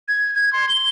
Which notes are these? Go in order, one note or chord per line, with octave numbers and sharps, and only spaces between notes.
G#6
G#6
C6
G7